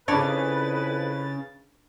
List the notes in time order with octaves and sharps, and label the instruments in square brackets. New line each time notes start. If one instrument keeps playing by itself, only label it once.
[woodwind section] F2 E4 B4 [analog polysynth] C#3 A6 [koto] D4 C#5 D5